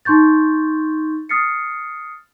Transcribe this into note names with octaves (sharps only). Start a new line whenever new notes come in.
D#4 C6 C#6 G6 A6
D#6 F6 A6 C7 C#7